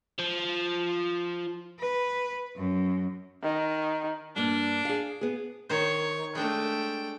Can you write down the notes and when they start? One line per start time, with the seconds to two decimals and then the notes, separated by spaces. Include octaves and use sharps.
0.19 F3
1.80 B4
2.56 F#2
3.43 D#3
4.36 G2 A#3 D4
4.85 G#4 F5
5.21 B3 G#4
5.69 D#3 C5 C#5
6.35 G#3 A3 D4 G5